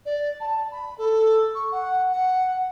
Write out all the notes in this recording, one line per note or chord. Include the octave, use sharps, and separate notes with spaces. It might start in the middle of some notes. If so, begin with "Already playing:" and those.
D5
A5
B5
A4
C#6
F#5
F#5